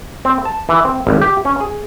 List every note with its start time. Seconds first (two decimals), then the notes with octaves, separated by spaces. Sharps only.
0.25 C4
0.45 A5
0.69 E3
0.85 C4
1.07 G#1
1.21 G4
1.45 C#4
1.61 G#4